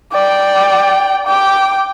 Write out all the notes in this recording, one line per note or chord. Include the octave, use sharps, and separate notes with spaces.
D5 G5
G5 D6